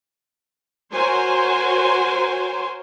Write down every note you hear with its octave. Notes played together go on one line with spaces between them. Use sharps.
F#4 A#4 C5 C#5 G#5 C6